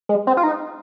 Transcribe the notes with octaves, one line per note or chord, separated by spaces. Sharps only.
G#3
C4
F4
D#4